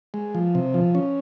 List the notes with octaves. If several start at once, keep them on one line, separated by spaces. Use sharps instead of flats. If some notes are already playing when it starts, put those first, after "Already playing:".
G#3
F3
C3
F3
C#4